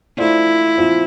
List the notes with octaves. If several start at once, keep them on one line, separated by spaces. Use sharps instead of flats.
A3 D4 E4 F4 C5
A#2 F3 C4 F4